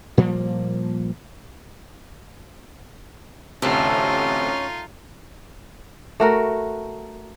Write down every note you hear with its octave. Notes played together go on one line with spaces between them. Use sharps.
A#2 F3 G3 A#3
A1 D2 C3 A3 C#4 D#4 F4
A3 F#4 A#4